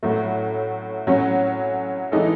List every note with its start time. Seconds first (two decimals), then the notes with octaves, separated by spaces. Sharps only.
0.03 A2 F#3 A3
1.07 A2 F#3 C#4
2.12 E3 G#3 D#4 A4